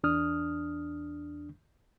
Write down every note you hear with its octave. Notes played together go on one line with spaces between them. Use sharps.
E2 D4 D#6 F6